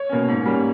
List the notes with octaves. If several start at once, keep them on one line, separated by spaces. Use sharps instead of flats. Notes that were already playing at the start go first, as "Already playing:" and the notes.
Already playing: C#5
B2 A#3 C#4
G#2
G3 A#3 C#4